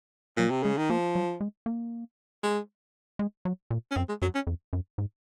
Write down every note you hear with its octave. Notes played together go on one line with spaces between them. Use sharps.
A#2 F#3
C3
C#3 G#3
D#3
F3 A#3
F#3
G#3
A#3
G#3
G#3
F#3
A#2
C#4
F#2 C4
G#3
F#2 F#3
C#4
F2
F#2
G#2